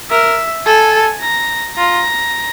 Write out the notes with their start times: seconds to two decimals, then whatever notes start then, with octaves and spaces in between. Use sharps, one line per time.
0.11 A#4 E5
0.66 A4 G#5
1.21 A#5
1.76 F4 A#5